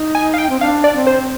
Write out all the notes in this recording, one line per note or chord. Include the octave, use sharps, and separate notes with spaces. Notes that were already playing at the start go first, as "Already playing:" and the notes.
Already playing: D#4
G#5
F5
G5
C4
D4 F5
D5
C4
C5